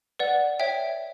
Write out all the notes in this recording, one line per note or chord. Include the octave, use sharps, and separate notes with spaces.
B4 D5 F#5
C#5 E5 G5